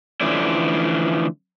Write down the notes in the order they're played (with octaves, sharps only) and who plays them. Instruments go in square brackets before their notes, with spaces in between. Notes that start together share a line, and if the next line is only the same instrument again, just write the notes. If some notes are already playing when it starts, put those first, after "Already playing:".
[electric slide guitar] D3 E3 F3 A3 C#4 D4